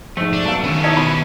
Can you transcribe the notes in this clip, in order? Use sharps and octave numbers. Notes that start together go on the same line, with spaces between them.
F2 G#2 A3
D4
F#3 B3 F5 A5
D#3 B3 C#4
C#4 D#4 E4 C#5 A5 A#5 D#6
B2 B5